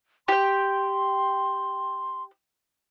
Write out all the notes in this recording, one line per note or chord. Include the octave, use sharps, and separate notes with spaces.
G4 G5 C6